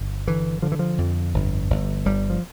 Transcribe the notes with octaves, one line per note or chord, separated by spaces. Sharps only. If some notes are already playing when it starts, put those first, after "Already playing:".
Already playing: G1
D3 E3
D3 F3
E3
F3
F2
G1
G1
G1 G3
F3